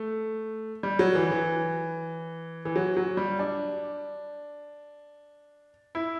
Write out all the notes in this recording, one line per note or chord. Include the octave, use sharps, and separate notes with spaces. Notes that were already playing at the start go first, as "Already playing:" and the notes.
Already playing: A3
G3
F#3
E3
E3
E3
F#3
F#3
G3
D4
E4